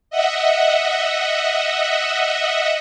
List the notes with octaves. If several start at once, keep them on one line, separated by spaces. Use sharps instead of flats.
D#5 E5 F#5